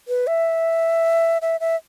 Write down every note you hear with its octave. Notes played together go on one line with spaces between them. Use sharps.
B4
E5
E5
E5